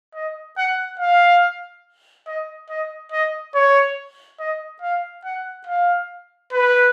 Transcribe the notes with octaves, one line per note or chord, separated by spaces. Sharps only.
D#5
F#5
F5
D#5
D#5
D#5
C#5
D#5
F5
F#5
F5
B4